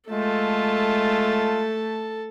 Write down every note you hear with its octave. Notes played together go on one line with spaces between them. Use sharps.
G#3 A3 F4 A4 A5